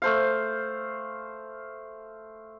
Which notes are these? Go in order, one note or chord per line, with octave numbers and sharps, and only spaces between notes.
A3 C5 F5